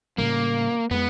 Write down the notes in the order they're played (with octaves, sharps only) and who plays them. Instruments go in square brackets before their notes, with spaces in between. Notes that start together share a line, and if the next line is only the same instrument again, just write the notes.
[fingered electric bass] A2 C#3 G3 [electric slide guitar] A#3
[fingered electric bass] F2 G#3 [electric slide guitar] B3